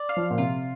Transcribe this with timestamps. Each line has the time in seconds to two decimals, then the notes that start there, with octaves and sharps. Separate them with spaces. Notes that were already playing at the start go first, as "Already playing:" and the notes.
Already playing: D5
0.09 F5
0.17 F3
0.30 A#2
0.38 C3 F4